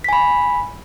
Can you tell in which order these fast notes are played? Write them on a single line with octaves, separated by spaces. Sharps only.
B6 G#5 B5